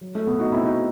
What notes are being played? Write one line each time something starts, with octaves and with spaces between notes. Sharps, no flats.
F#3
A3
B2 B3
D#4 F#4
B2 C4 E4
D#4 F#4